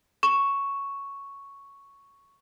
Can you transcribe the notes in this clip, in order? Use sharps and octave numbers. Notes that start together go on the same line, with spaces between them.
C#6 E7